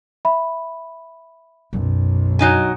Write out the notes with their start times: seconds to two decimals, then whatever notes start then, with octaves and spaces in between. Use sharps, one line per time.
0.25 E5 B5
1.73 B1 F#2
2.39 F#3 D#4 G#5